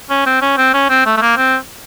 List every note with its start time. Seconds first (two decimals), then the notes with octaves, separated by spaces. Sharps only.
0.10 C#4
0.26 C4
0.42 C#4
0.58 C4
0.74 C#4
0.90 C4
1.06 A3
1.17 A3
1.21 A#3
1.37 C4